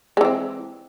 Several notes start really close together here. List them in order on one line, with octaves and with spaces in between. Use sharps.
G#3 E3 C4